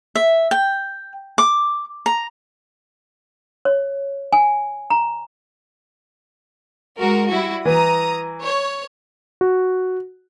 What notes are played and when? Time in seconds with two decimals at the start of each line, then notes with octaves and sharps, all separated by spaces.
0.15 E5
0.51 G5
1.38 D6
2.06 A#5
3.65 C#5
4.33 G#5
4.90 A#5
6.98 G#3 F#4 A#4
7.29 G3 E4 F#4
7.65 E3 A#5 D#6
8.42 C#5
9.41 F#4